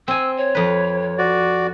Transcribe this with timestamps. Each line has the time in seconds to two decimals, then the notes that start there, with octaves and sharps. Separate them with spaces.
0.08 C4 G#5 E6
0.37 C#5
0.55 F2 B4
1.18 F#4 D5